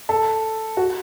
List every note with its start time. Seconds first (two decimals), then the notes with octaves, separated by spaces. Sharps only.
0.09 A4
0.77 F#4